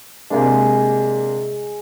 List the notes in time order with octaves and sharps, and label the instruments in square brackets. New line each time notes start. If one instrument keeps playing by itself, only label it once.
[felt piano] C3 A#3 D4 [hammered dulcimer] G#3